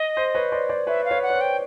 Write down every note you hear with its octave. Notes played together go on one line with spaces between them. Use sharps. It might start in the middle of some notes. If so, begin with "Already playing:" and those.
Already playing: D#5
C5
B4 C#5
C5 D5
C5 D5
B4 C#5 E5
F5
B4 C#5
F#5
C#5
C5
G5